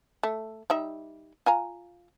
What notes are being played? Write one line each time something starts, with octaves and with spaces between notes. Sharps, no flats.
A3
G3 D#4 E5
F4 G#5 A#5